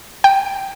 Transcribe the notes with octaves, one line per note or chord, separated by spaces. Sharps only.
G5